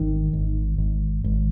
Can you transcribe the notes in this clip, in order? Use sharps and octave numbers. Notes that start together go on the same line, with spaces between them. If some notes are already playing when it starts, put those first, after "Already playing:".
Already playing: G#1 D#3
G#1
G#1
G#1